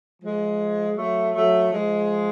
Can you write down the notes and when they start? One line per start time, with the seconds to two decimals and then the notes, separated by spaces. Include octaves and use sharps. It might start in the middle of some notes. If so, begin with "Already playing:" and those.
0.22 F3 G#3
0.96 F#3 A3
1.34 F#3 A3
1.72 F3 G#3